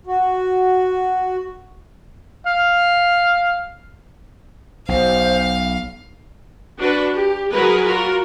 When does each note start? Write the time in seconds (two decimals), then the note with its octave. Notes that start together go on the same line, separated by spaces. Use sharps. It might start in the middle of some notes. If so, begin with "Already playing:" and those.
0.07 F#4
2.47 F5
4.89 B1 C5 F5
6.78 D4 F#4 B4
7.13 G4
7.51 F#3 F#4 G#4 A#4 B4
7.85 F4 F#4 A#4